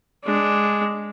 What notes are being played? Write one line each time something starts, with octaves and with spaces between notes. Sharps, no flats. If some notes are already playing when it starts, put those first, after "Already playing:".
G#3 D4